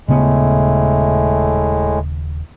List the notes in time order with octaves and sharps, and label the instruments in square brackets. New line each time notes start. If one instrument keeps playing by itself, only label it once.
[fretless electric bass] D#1 C#3 B3 [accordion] A2 G#3 A3